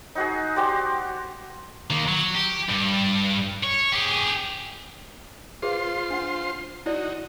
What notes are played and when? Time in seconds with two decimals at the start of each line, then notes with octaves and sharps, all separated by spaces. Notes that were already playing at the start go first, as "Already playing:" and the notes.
0.15 D#4 F#4 G#4
0.56 F#4 G4 C5 D5
1.90 D#3 A#3
2.08 F#3
2.35 G4
2.69 G2
3.64 C#5
3.92 G4 G#4
5.62 F4 G#4 B4 C5 F5 C6
6.11 D4 F#5
6.86 D#4 E4 F#4 D5